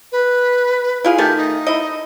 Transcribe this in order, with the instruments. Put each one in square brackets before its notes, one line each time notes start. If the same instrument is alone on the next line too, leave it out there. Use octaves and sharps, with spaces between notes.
[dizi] B4
[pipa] E4 F4 G#4
[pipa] D#3 A3 [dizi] G4
[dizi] D#4
[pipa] E4 D#5